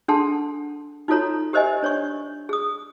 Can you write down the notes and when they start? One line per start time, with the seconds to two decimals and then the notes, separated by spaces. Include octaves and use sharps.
0.08 D4 G#4 A4 F#5 A5 C6
1.08 D#4 F4 F#4 A4 C#5 A#5
1.53 G4 A#4 C5 D#5 E5 G#5
1.83 D4 C#5 D5 C#6
2.49 G#4 D#6